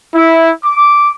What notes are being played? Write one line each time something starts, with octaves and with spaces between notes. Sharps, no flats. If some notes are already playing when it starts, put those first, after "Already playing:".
E4
D6